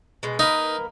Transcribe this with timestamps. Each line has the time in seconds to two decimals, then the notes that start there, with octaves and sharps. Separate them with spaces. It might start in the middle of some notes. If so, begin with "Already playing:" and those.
0.23 B2 G#3
0.39 A#3 D#4 A#4 B4